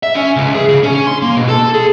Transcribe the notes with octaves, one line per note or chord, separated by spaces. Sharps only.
E5
C#4
C#2
G#4
C#3
C#4
C6
A#3
B2
A4
G#4